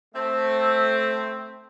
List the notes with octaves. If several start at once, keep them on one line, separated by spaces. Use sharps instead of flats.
A3 C4